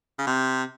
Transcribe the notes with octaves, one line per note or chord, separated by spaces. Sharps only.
C#3
C3